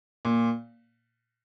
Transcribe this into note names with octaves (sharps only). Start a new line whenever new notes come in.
A#2